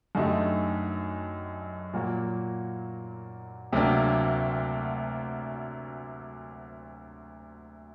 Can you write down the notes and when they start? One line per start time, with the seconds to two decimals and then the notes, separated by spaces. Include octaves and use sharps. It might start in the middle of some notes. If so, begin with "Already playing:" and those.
0.15 F#2 D3 A3 D#4 G4
1.93 A#2 F#3 A#3 F#4
3.72 D2 C3 F#3 A#3 D4